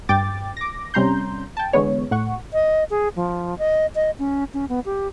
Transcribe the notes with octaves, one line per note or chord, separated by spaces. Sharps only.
G2 G5 D6 A6
D6 A#6
C3 G3 C#4 A#5 C6 G6
G5 A5
D3 E3 G#3 B3 C#5
A2 F#5 C#6
D#5
G#4
F3
D#5
D#5
C#4
C#4
B3
G4